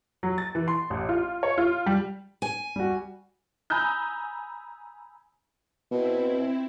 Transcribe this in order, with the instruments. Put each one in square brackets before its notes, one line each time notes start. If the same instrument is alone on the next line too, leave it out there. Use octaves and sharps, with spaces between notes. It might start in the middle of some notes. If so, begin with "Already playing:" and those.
[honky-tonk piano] F#3
A6
E3
C6
A1
F4
C#5
F4
G3
[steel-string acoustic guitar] G#5
[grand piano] G3 F#4
[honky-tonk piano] G#5 A#5 B5 D#6 E6 G6
[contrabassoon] B2 [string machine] C4 E4